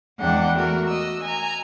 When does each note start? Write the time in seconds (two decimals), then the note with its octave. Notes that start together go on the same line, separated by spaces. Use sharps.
0.19 E2 G#3 D4 F#5 G5
0.54 A3 F#4 A#4
0.87 D#5 E6
1.22 G#5 A#5